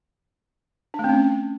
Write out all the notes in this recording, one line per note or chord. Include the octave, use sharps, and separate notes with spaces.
D4
A3
C4
C#4